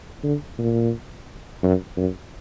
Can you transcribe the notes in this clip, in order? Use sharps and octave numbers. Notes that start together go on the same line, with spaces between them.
D3
A#2
F#2
F#2